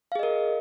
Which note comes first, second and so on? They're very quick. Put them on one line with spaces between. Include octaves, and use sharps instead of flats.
F5 G#4 D#5 A#4